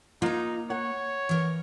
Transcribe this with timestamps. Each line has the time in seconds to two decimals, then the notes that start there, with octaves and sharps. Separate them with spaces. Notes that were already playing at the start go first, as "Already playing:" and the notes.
0.22 A#3 D#4 F4 A#5
0.70 C#5 F#5
1.29 E3 A#4